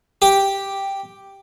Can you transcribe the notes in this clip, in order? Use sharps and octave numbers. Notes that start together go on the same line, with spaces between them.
G4